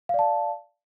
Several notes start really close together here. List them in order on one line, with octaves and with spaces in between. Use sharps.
F5 D5 A5